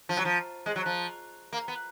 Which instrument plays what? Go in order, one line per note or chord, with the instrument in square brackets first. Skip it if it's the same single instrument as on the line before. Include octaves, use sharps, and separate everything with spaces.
[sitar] F3
F#3
F3
G#3
F#3
F3
A#3
B3